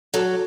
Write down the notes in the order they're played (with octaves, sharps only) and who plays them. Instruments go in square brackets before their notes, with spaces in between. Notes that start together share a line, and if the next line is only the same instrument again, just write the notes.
[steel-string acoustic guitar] F#3 A4